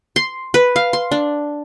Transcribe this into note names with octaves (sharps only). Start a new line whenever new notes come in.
C6
B4
F5
C6
D4